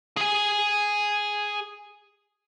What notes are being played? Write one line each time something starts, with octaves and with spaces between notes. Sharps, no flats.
G#4 G#5